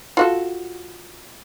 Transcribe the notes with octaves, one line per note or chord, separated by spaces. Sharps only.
F4 F#4 A4